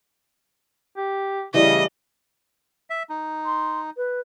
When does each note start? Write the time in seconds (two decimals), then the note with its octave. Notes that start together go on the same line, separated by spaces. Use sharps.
0.97 G4
1.54 C#3 E3 G3 A3 D#5
2.90 E5
3.10 D#4
3.45 C6
3.97 B4